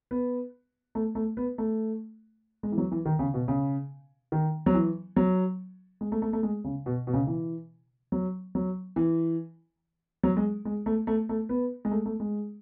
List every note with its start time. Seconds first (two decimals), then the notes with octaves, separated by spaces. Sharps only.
0.11 B3
0.95 A3
1.15 A3
1.37 B3
1.58 A3
2.63 G#3
2.72 E3
2.78 F#3
2.92 E3
3.05 D#3
3.19 C#3
3.34 B2
3.48 C#3
4.32 D#3
4.66 F#3
4.74 E3
5.16 F#3
6.01 G#3
6.12 A3
6.22 A3
6.33 A3
6.43 G#3
6.64 C#3
6.86 B2
7.07 B2
7.13 C#3
7.27 E3
8.12 F#3
8.55 F#3
8.96 E3
10.23 F#3
10.37 G#3
10.65 G#3
10.86 A3
11.07 A3
11.29 A3
11.49 B3
11.85 G#3
11.91 A3
12.06 A3
12.20 G#3